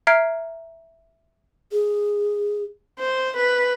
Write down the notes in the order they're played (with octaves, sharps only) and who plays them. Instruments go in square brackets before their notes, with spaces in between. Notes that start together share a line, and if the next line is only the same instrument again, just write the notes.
[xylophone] E5 A#5 F6 G#6 C7 D7
[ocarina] G#4
[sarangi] C5
B4